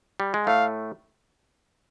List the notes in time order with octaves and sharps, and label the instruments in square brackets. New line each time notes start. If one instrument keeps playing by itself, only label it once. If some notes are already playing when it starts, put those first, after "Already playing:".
[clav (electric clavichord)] G3
G#3
[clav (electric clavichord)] A2 A3 [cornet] F5